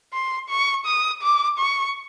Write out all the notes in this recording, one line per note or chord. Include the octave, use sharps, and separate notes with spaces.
C6
C#6
D#6
D6
C#6